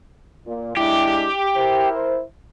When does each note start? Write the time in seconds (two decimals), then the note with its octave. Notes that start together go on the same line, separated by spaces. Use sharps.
0.47 A#2
0.77 G#3 D4 E4 G4
1.56 E4 A#4 C5